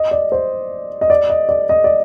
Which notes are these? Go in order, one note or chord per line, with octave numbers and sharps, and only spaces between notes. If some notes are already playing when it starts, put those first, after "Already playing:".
Already playing: D#5
D5
C5
D#5
D5
D#5
D5
D#5
D5